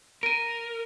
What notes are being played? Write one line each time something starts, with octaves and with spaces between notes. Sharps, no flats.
A#4 D7 D#7